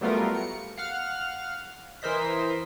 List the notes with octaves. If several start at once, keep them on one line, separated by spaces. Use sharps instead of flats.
F#3 G3 A3 B3 F4 A#4
C#7
F5 F#5 F6
E3 A#4 C5 D#5 B6